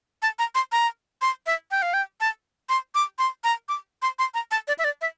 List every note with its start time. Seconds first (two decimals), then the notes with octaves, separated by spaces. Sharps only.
0.22 A5
0.39 A#5
0.55 C6
0.72 A#5
1.22 C6
1.46 E5
1.71 G5
1.82 F5
1.94 G5
2.21 A5
2.69 C6
2.95 D6
3.19 C6
3.44 A#5
3.69 D6
4.02 C6
4.19 C6
4.34 A#5
4.51 A5
4.68 D5
4.79 E5
4.84 D5
5.01 E5